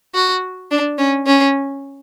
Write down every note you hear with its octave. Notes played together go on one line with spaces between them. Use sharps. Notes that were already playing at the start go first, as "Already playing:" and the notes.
F#4
D4
C#4
C#4